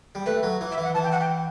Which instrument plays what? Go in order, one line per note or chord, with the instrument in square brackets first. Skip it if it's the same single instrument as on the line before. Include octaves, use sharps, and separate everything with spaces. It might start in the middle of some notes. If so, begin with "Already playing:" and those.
[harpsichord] G3
[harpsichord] A3 [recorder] B4
[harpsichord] F#3
E3
[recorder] E5
[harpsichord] E3
[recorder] F#5
[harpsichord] E3 [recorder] A5
[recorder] G5
F#5
G5